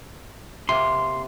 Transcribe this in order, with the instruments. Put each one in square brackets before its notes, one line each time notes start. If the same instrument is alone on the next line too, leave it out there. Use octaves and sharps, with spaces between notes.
[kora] C3 A#3 [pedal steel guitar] C6